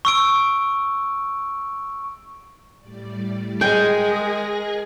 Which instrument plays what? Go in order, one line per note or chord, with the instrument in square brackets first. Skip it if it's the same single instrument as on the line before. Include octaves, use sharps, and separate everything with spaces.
[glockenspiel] C#6 E6 D7
[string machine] A2 G3 D5
[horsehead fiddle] G#3 [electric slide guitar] G#4 [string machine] A#4 A#6 [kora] G5